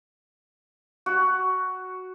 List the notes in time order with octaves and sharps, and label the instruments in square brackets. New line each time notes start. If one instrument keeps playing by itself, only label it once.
[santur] F#4